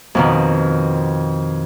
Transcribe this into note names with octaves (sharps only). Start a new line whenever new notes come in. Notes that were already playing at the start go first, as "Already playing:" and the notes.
F2 B2 D#3